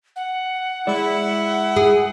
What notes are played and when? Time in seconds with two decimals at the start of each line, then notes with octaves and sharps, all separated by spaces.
0.16 F#5
0.87 G#3 E4 D5
1.76 G#4